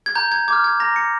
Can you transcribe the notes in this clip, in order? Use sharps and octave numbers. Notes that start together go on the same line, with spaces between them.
G#6
A#5 G6
G#6
D6 F6 G#6
G#6
A#5 A#6
C#7